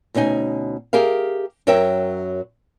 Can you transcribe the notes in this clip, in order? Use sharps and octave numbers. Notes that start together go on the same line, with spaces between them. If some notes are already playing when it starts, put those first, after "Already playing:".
D2 B2 C#4 D#4 G#5
G4 G#4 A#4 E5 F5
F#2 F#3 A#4 C#5 E5 G5